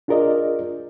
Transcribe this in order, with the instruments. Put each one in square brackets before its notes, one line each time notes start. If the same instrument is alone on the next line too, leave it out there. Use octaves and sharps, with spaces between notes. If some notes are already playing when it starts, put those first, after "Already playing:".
[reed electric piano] D4 F4 G#4 A#4 D5 D#5